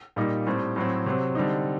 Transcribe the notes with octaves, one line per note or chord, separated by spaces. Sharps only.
A#2 G3 A#3 D#4
A2 G3 C4
A2 F#3 C4
C3 F#3 C4
D3 G3 C4 D#4